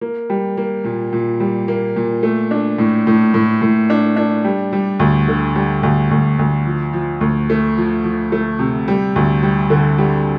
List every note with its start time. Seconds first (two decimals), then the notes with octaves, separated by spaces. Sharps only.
0.01 A#3
0.30 G3
0.57 A#3
0.84 A#2
1.13 A#2
1.40 G3
1.68 A#3
1.96 A#2
2.23 A3
2.51 D4
2.78 A2
3.07 A2
3.34 A2
3.62 A2
3.90 D4
4.16 D4
4.45 G3
4.73 G3
5.00 D2
5.28 D3
5.56 G3
5.83 D2
6.11 D2
6.39 D2
6.66 F3
6.93 F3
7.21 D2
7.50 A3
7.77 F3
8.04 F3
8.32 A3
8.59 C3
8.88 G3
9.16 D2
9.43 G3
9.70 D3
9.98 G3